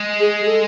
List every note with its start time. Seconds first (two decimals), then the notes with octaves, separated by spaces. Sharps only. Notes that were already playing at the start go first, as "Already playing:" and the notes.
Already playing: G#3
0.20 G#4
0.42 G#4
0.47 A4